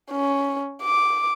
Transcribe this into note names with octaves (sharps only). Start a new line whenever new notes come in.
C#4
D6